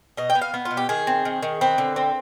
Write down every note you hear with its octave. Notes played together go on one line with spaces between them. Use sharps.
B2 D#5
G5
B3
F5
B3
F4
B2
G4
D#3 G#4
C4
D#3
D#3
C4 B4
D3
C4